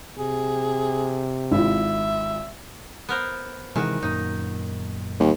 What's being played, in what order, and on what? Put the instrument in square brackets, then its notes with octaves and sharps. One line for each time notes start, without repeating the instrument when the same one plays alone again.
[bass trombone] C3 [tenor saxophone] G#4
[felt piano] G#1 E4 F4 [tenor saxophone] E5
[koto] B3 A#4 C5
[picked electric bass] C3 E3 G#3 [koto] D#3 F#4
[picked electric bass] F#2 A#2 [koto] D#4
[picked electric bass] A1 G3 [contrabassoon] D#2